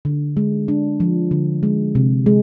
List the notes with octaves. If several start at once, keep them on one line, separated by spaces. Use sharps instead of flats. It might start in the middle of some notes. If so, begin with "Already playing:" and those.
D3
G#3
D4
F3
D3
G#3
C3
G#3